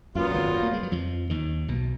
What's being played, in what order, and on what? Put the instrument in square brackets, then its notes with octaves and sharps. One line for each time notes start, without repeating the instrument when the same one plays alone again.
[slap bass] F#2 [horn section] A#2 F#3 B3 F4
[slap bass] F#2
G#1 G#2
F#2
A#3
G#3
F#3
F2 F3
D#2 D#3
B1 B2